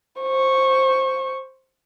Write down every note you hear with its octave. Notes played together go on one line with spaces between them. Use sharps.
C5 C#6